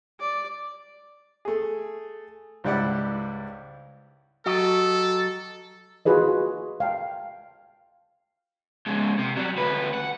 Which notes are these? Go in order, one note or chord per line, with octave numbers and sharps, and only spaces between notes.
D5
A3 G#4
C#2 G#2 G3 E4 D5 F#5
F#3 F#4 G4 A4 D#5
F4 F#4 G#4 B4 D#5
F5 G5 A5
G#2 C#3
C3
F#3 G3
D2 B4
F#5